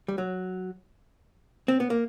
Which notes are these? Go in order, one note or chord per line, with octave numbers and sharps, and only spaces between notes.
G3
F#3
C4
B3
A#3